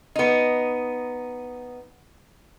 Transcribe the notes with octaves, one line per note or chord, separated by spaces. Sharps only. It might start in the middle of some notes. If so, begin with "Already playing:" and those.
B3 D#4